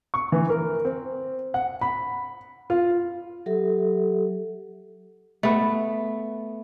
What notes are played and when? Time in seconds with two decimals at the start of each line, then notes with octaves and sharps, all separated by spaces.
0.14 C#6
0.32 E3
0.50 A#4
0.85 C4
1.54 F#5
1.81 B5
2.70 F4
3.46 F#3 G4 A4 E5
5.43 A3 B3